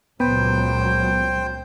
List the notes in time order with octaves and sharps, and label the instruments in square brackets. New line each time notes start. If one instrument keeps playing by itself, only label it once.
[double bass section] C#2 A#2 F#3 [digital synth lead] B3 [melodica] C5 G5